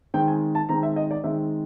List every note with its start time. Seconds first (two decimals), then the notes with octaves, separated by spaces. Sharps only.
0.14 D#3 G#3 C4 G5
0.28 G#5
0.55 A5
0.69 D#3 G#3 C4 A#5
0.83 E5
0.96 D#5
1.11 D5
1.24 D#3 G#3 C4 E5